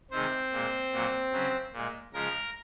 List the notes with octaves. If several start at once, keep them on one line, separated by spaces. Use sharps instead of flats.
C3 D#3 G#3 C4 C5
A#2 G#3
A#2 F#3
C#3 F#3
A#2 G#3
C#3 F3 G#3 A#4 A#5